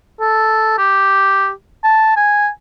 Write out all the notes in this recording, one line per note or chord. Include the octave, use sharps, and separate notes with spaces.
A4
G4
A5
G#5